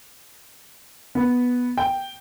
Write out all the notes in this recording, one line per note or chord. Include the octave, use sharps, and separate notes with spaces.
B3
G5